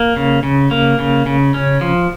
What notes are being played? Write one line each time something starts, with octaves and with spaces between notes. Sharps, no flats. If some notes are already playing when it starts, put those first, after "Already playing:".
Already playing: A#3
C#3
C#3
A#3
C#3
C#3
C#4
F3